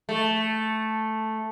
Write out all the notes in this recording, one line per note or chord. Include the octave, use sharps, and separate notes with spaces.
A3